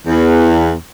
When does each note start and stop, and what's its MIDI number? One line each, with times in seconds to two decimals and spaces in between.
0.07 0.70 40